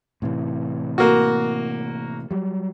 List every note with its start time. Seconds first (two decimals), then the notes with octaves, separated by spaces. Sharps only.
0.22 A2 C3 E3
0.98 A#3 F#4
2.31 F#3 G3